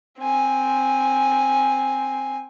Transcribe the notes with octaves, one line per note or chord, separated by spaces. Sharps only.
C4 G#5